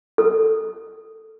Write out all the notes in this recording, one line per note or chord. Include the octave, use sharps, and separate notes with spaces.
A4